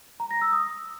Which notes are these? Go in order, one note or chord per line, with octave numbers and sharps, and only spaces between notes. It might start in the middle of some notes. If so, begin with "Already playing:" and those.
A#5
A#6
E6
D#6